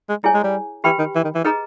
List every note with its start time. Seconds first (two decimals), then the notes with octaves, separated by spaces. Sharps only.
0.09 G#3
0.24 G3 E4 G#4 C#5 G#5
0.34 G#3
0.44 G3
0.84 E3 G4 B4 G5 B5
0.99 D#3
1.15 E3
1.24 D#3
1.35 E3
1.44 D#4 G#4 B4 D#5 A#5